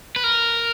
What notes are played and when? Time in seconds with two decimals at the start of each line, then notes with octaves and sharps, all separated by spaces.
0.16 B4
0.24 A#4